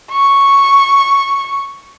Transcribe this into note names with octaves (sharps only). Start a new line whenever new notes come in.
C#6